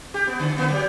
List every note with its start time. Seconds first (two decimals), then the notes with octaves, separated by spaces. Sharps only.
0.14 G4
0.27 B3
0.40 D3
0.57 D3 A#3 B3
0.70 F#3 G4